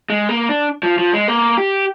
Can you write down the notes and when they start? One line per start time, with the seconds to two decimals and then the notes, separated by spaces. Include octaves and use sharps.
0.10 G#3
0.29 A#3
0.49 D4
0.83 F3
0.99 F3
1.13 G#3
1.28 A#3
1.58 G4